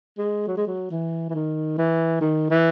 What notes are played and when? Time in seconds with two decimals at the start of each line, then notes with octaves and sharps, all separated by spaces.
0.18 G#3
0.48 F#3
0.57 G#3
0.67 F#3
0.91 E3
1.30 E3
1.35 D#3
1.78 E3
2.21 D#3
2.50 E3